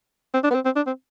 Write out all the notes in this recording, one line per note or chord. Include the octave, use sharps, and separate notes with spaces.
C4
D4
B3
C4
C4
D4
C4